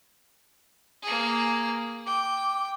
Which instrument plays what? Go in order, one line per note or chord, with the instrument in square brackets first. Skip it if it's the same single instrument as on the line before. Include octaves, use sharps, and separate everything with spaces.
[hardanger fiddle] A#3 G#4
[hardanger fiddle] G5 [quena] D6